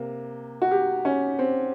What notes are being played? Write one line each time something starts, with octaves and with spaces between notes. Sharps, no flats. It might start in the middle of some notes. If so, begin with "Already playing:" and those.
Already playing: C3 A#3
F#4
G4
C#4
C4